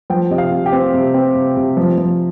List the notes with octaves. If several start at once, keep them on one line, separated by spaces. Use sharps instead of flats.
F3 G5
C3 D#5
F5
C3
G4
C4
C3
C4
C3
C3
F3
F3